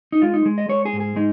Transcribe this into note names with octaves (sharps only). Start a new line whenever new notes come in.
D#4
G#3 F4
D#4
G#3
D#5
G#3 C#5
G#4
G#2
G#4
G#3 D#4